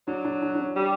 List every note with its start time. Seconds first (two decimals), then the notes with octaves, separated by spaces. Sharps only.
0.08 F#3 D4
0.25 D4
0.42 D4
0.55 D4
0.59 C#4
0.76 G3